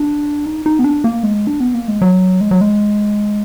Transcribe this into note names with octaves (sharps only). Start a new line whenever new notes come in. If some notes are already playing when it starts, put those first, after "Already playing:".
Already playing: D4
D#4
D#4
B3
D4
A#3
G#3
D4
B3
A#3
G#3
F#3
G#3
F#3
G#3